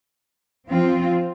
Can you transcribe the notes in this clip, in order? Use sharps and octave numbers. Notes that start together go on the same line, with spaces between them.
F3 C4 F4